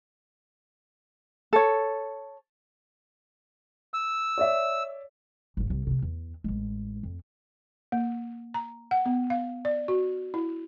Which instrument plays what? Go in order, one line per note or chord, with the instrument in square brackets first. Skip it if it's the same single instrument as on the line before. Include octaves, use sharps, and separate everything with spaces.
[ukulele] A4 C#5
[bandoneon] E6
[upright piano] C#5 D5 E5
[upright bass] G1 G#2
C2
C3 A3
E2
A1 G#3
F2
[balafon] A#3
A#5
F#5
B3
F5
D5
F#4
E4